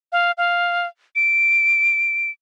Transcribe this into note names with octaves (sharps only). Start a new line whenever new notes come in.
F5
F5
D7